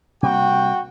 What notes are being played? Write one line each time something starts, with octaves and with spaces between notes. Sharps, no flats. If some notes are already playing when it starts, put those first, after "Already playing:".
C3 G3 A#3 F#4 G5